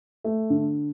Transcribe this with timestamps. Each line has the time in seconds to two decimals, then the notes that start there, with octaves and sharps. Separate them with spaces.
0.24 A3
0.50 D3